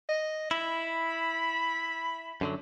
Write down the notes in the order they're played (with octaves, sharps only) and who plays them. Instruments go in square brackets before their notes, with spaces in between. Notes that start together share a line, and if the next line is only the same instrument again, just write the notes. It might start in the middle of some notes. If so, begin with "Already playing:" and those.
[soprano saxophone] D#5
[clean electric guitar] E4 [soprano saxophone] B5
[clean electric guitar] F#2 D3 F#3